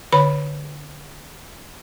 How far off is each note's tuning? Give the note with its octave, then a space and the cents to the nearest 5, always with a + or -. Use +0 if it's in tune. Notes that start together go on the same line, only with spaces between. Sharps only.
D3 +0 C#5 +0 B5 +0